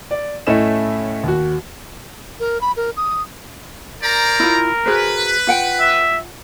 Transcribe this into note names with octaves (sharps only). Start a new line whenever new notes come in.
D5
A2 A3 C#4 E4 D#5 E7
D#2 F#4
A#4
B5
A#4
D#6
A#4 C5 D5 A#5
E4 F4
F#4 G#4 B4 C5
F4 F#5 G5
E5